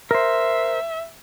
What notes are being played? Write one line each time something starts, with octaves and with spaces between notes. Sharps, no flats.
A#4 C5 E5